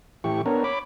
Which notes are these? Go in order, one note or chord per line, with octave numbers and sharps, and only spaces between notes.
A2 E3 G4 C#6
B3 D4 A#4 C#5
C#5 B5 D6